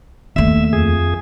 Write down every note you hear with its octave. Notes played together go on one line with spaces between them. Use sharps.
D#2 A3 E5
F2 G#4